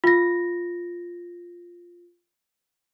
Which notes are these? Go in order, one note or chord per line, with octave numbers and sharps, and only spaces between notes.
F4 A#6